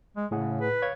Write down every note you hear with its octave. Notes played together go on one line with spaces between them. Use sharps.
G#3
A2 C#3 G#4 F#5
B4
C#5 F5 G#6